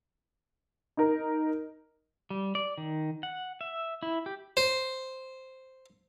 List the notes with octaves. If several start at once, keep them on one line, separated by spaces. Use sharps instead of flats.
D#4 A#4
G3
D5
D#3
F#5
E5
E4
G4
C5